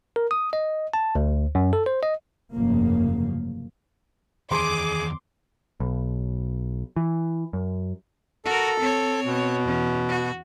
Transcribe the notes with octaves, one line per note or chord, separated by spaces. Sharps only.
A#4
D#6
D#5
A5
D2
F#2
A4
C5
D#5
F1 G2 C#3 F3 F#3 A#3
E2 D#3 G#4 C6 D6
B1
E3
F#2
F#4 A4 A#4
C4 C#5
B2
E2 C#4
F#4